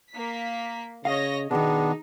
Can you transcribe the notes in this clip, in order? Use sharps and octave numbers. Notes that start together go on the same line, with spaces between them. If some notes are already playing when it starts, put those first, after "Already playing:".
A#3 B6
C#3 C#5 D#5 F5 A#6
B2 D#3 B3 D4 D#4 G#4